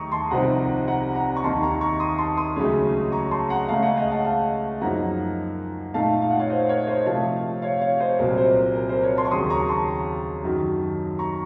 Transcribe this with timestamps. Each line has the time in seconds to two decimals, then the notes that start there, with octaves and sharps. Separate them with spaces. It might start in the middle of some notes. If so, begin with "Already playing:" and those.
Already playing: D#2 D#3 A3 A#5 C#6 D#6
0.12 A5 C6
0.31 C2 C3 F3 C4 D#4 F#5 A#5
0.88 F#5 A#5
1.15 F#5 A#5
1.36 C#6
1.43 D#2 D#3 A#3 D#4 A5 C6
1.63 A#5 C#6
1.81 A#5 C#6
2.00 C6 D#6
2.18 A5 C6
2.37 C6 D#6
2.56 C#2 C#3 F#3 A3 C#4
3.12 A#5 C#6
3.31 A5 C6
3.50 F#5 A#5
3.68 C#2 C#3 A3 C#4 F5 A5
3.83 D#5 F#5
3.97 D#5 F#5
4.11 F5 A5
4.25 F5 A5
4.81 F#2 F3 A#3 D#4 F#5 A#5
5.94 A#2 A3 D#4 F5 A5
6.22 F5
6.31 F#5
6.39 C#5 F5
6.50 C5 D#5
6.69 A#4 C#5
6.87 C5 D#5
7.06 C3 F3 A3 F5 A5
7.62 C#5 F5
7.81 C#5 F5
8.00 C5 D#5
8.19 C2 A#2 F#3 C4 A#4
8.38 C5
8.56 A#4
8.75 A#4
8.89 C5
9.03 A#4 C#5
9.17 A5 C6
9.25 C#6
9.31 D#2 C#3 F#3 C6 D#6
9.50 A#5 C#6
9.69 A5 C6
10.44 F#2 D#3 F#3
11.19 A#5 C#6